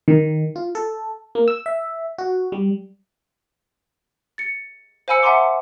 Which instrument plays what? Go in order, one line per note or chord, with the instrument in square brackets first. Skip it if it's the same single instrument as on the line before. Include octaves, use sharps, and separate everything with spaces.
[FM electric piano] D#3
F4
A4
A#3
E6
E5
F#4
G3
[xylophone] A6 C#7
C5 F5 G#5 B5 E6 C#7
E5 F#5 G#5 A#5 C6 D6